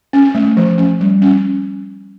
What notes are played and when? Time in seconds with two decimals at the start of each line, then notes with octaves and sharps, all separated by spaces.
0.13 C#4
0.35 A3
0.57 F3
0.78 C#4
1.00 G3
1.22 C#4